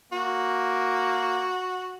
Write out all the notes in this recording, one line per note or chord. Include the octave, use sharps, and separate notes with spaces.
A#3 F#4